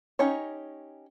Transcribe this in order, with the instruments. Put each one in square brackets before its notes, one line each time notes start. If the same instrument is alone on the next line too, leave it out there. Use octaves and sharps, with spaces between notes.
[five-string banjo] C#4 D#4 G4 C#5